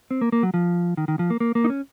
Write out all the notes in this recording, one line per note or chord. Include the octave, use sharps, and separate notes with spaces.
C4
A#3
A#3
F#3
F3
D#3
D#3
F3
A#3
A#3
A#3
D#4
C#4